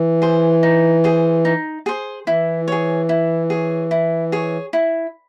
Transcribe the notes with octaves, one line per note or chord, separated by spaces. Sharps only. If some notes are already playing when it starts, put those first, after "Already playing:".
Already playing: E3
G#4 C5
D#4
G#4 C5
D#4
G#4 C5
E3 E4
G#4 C#5
E4
G#4 C#5
E4
G#4 C#5
E4